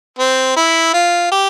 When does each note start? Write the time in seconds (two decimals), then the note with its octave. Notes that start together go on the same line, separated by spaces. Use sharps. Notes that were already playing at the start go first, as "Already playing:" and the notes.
0.19 C4
0.56 E4
0.94 F4
1.31 G4